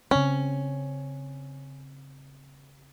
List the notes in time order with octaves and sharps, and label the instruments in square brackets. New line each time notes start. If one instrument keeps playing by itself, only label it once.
[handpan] C#3 C4 [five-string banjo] C#4